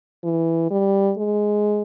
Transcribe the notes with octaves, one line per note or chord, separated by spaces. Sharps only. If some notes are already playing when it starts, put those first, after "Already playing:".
E3
G3
G#3